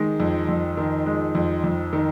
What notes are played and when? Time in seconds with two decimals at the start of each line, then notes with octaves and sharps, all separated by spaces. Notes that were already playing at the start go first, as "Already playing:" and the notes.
Already playing: D#3 G#3
0.20 F2
0.49 F2
0.77 D#3
1.06 G#3
1.35 F2
1.64 F2
1.93 D#3